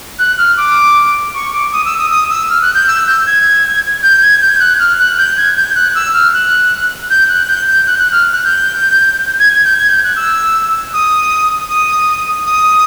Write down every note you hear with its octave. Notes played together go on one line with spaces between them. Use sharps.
F#6
F6
D6
C#6
D6
D#6
E6
D#6
D#6
E6
F6
F#6
G6
E6
G6
G#6
G6
G#6
G6
F#6
F6
F#6
G6
G#6
G6
F#6
E6
F6
F#6
G6
F#6
G6
G6
F#6
F#6
F6
F#6
G6
G#6
G#6
G6
G#6
G6
F#6
E6
D#6
D#6
D#6